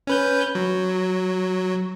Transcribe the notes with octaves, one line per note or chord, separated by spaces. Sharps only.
C#4 B4 G6
F#3